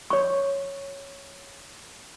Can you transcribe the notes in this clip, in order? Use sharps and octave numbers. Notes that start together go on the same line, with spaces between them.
C#5 C#6